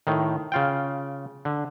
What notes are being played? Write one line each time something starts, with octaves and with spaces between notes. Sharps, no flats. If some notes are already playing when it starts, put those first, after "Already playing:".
A2 D#3
C#3 F4 G5
D3